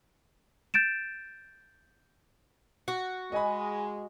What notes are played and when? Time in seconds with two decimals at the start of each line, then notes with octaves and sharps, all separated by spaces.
0.74 G6 A6 D7 E7
2.88 F#4
3.32 G#3 D#5 G#5 B5